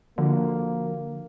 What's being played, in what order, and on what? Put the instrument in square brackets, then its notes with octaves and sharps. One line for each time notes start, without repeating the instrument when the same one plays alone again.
[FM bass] D3 [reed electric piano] F3 D4 F#4 [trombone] A#3